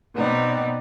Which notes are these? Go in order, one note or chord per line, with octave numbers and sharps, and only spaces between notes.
B2 B3 C4 D#4 D5